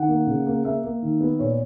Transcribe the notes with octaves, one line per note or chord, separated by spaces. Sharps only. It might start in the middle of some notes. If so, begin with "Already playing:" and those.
Already playing: D#3 F#5
A#3
C#3
A#3
A#3 E5
A#3
D#3
B3
A#2 C#5